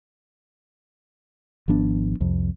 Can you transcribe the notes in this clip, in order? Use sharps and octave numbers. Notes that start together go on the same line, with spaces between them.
G#1 F3 B3 D4
C2 F2